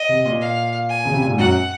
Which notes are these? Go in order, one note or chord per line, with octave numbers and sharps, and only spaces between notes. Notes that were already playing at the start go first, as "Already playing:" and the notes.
Already playing: D#5
C3
A#2
F5
G#5
C#3
C3
A#2
G#2
F#2 F#5